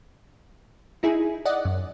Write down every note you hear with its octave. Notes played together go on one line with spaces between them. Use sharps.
D#4 E4 G#4
D5 D#5 F#5
F#2